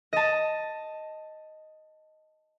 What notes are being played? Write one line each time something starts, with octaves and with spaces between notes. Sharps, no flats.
D#5 A5